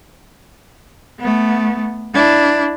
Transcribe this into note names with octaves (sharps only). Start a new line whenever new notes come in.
A3 B3
D4 E4